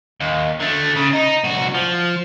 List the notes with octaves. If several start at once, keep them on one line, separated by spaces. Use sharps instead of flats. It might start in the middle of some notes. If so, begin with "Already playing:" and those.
D#2
D3 A3
C#3
D#4
C2 F#4
F3